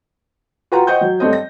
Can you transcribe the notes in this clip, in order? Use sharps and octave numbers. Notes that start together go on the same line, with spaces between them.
F4 F#4 B4 F#5 G5 A#5
C5 D#5 F#5 G5 C#6 G6
F#3
G2 A3 C4 C#4 D#5
A#6